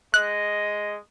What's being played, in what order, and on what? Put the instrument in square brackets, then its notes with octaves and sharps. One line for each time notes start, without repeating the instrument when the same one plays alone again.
[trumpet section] G#3 D#5 [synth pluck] F#6